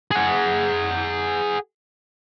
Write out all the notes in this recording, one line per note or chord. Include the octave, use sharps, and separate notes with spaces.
G#4 F#5